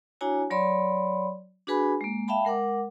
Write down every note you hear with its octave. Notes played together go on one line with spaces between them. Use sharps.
D4 E4 F#4 C#5 G#5 A#5
F#3 C#5 D5 B5 C6
D4 F#4 G#4 B4 G#5 B5
G#3 A#3
E5 F5 G5 A5 B5
G#3 A#4 F#5 D6